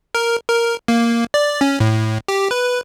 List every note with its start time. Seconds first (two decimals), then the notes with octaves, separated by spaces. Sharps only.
0.15 A#4
0.49 A#4
0.88 A#3
1.34 D5
1.61 C#4
1.80 A2
2.28 G4
2.51 B4